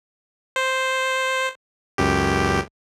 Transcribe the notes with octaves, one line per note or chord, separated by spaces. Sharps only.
C5
C#2 F#2 G4